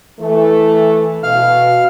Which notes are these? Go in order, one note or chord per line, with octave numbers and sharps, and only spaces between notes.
E3 A3
B2 F5 F6